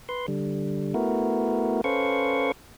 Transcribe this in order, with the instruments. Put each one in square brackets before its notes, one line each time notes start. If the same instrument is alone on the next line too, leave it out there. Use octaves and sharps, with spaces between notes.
[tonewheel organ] B4 C6
D3 G3
A3 B3 E4 F#4 A#4
C#4 A4 B4 C5 F5 C#6